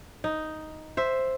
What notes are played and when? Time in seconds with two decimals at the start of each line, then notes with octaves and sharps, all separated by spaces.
0.24 D#4
0.97 C5 E5